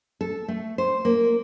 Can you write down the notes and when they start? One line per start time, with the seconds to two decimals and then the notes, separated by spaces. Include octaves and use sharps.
0.21 A4
0.48 A3
0.78 C5
1.05 A#3